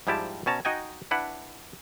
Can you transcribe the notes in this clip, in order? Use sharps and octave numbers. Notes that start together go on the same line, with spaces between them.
G#2 F3 G3 E4 G4 A5
B2 C#4 A5 A#5
D#4 F#4 D#5 G5 G#5
D4 E4 B4 F#5